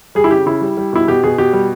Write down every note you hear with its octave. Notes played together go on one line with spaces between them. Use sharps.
G3 G#4
E4
C#3 G4
C#3 E4
G3
G3
B2 E4
B2 G4
B2 G#4
B2 G4
G3